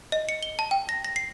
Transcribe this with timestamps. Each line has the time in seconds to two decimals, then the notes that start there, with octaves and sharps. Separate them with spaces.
0.12 D#5
0.29 C#7
0.43 G7
0.59 A5
0.71 G5
0.89 A#6
1.05 A#6
1.16 C7